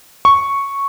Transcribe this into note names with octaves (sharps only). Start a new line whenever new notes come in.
C#6